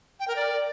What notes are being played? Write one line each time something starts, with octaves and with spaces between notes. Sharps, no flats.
G5
A#4
D5